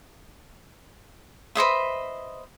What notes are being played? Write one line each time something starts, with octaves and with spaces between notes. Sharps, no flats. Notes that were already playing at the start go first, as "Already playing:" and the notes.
B4 C5 D#5 E5